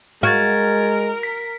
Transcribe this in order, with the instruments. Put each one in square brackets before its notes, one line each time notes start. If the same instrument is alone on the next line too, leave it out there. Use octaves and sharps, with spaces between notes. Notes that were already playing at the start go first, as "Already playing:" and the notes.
[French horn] G#3 [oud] F#4 [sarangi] A#4 [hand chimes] F6 G#6 A6
[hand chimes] B6